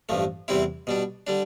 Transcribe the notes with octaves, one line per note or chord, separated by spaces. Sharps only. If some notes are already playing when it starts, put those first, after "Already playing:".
A1 G2 F3 A3
E2 C3 G3 C4 E4
B2 G3 D4
D3 G3 D4